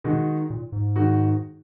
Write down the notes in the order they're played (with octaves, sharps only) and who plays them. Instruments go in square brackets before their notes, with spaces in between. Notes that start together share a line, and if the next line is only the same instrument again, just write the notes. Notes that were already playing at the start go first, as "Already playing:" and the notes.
[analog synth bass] B2 [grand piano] D#3 G#3 D#4 F#4
[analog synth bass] A#2
G#2
[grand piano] D#3 G#3 D#4 F#4